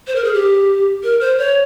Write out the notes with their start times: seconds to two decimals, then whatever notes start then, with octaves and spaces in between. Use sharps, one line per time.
0.07 C5
0.16 A#4
0.24 G#4
0.34 G4
1.03 A#4
1.21 C5
1.39 C#5